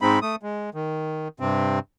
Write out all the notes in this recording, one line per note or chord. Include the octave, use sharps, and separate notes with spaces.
G#2 G#3 C4 D#4 B5
A3 D#6
G#3
D#3
G2 C3 C4